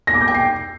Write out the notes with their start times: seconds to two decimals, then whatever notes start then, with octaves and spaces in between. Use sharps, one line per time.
0.07 A#6
0.14 D6
0.21 G6
0.28 G5
0.34 C7